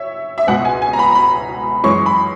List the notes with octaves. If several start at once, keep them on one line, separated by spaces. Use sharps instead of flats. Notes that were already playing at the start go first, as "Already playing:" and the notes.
Already playing: C#5 E5
E5
C#2 B2 G#3 F#5
G#5
G#5
A#5
B5
B5
F#2 E3 G#3 C#4 C#6
B5